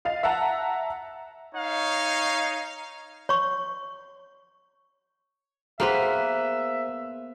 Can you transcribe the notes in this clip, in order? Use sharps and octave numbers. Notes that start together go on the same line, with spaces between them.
D#5 F5 A6 F7
E5 F#5 A5 A#5
D#4 C#5 F5
C#5 C#6
A#3 B3 G#4 B4 C5 E5